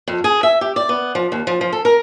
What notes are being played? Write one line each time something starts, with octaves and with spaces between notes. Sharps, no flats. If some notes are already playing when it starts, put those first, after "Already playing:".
F2
G#4
E5
G4
D5
B3
F3
D#2
F3
F3
A4
A#4